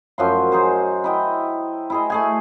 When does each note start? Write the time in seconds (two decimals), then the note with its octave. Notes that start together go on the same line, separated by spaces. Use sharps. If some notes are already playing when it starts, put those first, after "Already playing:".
0.18 F#2 F3 C6
0.52 D#4 G#4 C5
1.04 E4 D#5 G5
1.90 E4 G#4 D#5
2.10 A3 G#4 G#5